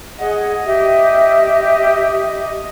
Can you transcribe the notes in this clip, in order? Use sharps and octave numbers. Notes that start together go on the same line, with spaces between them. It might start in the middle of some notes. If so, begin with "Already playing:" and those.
G#4 D#5 F#5
G4 E5